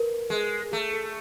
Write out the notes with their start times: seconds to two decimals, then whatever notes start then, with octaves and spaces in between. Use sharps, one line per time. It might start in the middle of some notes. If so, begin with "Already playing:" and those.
Already playing: A#4 B4
0.30 G#3
0.72 A3 G#4
0.93 A4